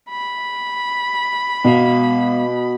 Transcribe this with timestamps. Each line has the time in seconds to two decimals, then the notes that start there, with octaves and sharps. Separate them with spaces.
0.10 B5
1.65 B2 B3 F5